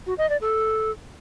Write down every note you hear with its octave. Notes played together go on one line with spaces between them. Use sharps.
F#4
D#5
D5
A4